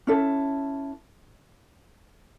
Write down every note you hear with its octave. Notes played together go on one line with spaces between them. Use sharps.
C#4 E4 A4